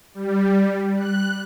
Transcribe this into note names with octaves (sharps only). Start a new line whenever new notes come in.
G3
F#6